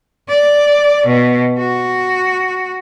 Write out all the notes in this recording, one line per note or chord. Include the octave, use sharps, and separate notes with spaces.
D5
B2
F#4